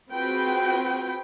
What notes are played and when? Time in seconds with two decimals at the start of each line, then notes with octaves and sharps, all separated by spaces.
0.11 C4 F4 F#4 G#4 B4 G5